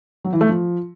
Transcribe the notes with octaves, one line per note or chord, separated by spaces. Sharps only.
F#3
E3
A3
F3